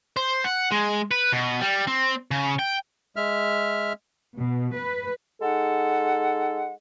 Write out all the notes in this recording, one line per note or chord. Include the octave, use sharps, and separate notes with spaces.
C5
F#5
G#3
B4
B2
G3
C4
C#3
G5
G#3 E5 F6
B2
B4
G#3 D#4 A4 F#5